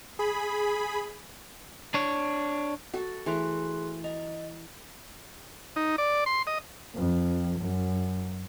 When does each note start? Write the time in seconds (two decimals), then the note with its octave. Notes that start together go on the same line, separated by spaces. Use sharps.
0.19 G#4 B5
1.94 D4 C#5
2.93 F#4 A4
3.26 E3 A3 G#4 A#5 C6 F#6
4.04 D#5 A#5
5.76 D#4
5.98 D5
6.26 C6
6.47 D#5
6.94 F2
7.60 F#2